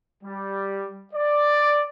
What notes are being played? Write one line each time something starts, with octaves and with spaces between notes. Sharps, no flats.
G3
D5